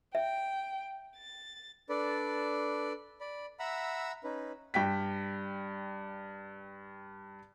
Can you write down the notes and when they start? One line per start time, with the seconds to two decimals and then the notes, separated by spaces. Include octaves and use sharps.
0.15 E5 G5
1.16 A6
1.89 D4 A4 B4 D5
3.21 D5 B5
3.59 E5 F#5 A#5 B5 E6
4.24 C#4 D#4 B4
4.74 G2 G5 B6